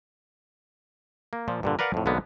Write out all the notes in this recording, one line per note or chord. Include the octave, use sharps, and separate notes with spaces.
A#3
A#2 F3
G2 A#2 D3
A#4 B4 D5 F5 F#5
F2 A2
B1 D3 G#3 A#3 B3